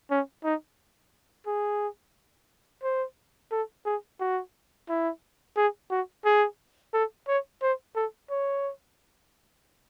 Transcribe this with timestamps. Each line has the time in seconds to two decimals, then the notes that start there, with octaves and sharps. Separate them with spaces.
0.10 C#4
0.44 D#4
1.47 G#4
2.83 C5
3.52 A4
3.86 G#4
4.20 F#4
4.89 E4
5.57 G#4
5.90 F#4
6.25 G#4
6.93 A4
7.28 C#5
7.62 C5
7.96 A4
8.30 C#5